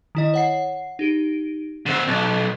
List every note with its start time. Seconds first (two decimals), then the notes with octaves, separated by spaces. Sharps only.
0.15 D#3 E4 D#5
0.34 C#5 F#5 C7
0.99 D#4 G4 D7
1.86 D3 C4 E7
2.08 B1